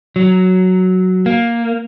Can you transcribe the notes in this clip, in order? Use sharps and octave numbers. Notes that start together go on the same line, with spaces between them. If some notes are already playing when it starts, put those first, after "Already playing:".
F#3
A#3